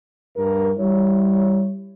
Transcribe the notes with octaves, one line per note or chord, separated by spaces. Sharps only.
G2 A#4
G3 E4 C#5